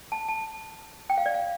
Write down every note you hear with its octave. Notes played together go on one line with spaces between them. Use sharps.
A5
A5
G5
F5
D5
F5